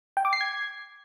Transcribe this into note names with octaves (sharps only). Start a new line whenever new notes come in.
G5
D6
C7
G#6